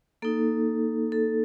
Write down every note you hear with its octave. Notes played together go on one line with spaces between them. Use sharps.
A#3 D#4 A4
A4